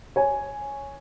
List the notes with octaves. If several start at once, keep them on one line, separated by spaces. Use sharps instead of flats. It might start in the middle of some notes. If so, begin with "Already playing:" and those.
C#5 G#5